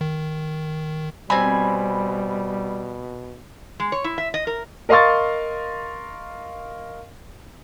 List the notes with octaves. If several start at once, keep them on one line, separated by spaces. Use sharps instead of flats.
D#3
B2 G3 C4 G#5 B5
G#3
C#5
E4
E5
D#5
A#4
A#4 D#5 F5 C6 C#6 A6